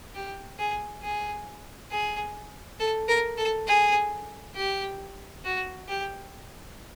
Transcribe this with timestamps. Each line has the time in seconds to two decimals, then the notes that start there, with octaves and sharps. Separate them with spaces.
0.15 G4
0.59 G#4
1.03 G#4
1.91 G#4
2.80 A4
3.09 A#4
3.38 A4
3.68 G#4
4.56 G4
5.45 F#4
5.88 G4